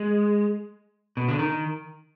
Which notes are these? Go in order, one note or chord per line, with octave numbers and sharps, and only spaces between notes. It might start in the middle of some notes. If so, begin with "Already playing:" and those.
Already playing: G#3
B2
D3
D#3